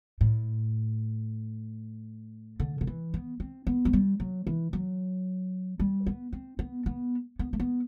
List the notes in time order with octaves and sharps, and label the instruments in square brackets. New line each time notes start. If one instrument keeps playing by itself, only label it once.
[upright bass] A2
D3
D3
E3
B3
C4
B3
F#3
G3
F#3
E3
F#3
G3
B3
C4
B3
B3
B3
A3
B3